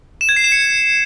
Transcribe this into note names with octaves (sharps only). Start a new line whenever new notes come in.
E7
G#6
C7
E7
C#7